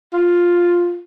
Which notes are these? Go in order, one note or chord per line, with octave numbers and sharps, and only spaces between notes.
F4